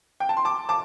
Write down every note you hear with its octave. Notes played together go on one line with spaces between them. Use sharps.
G5
A5
C6
A5 D6
A5 D6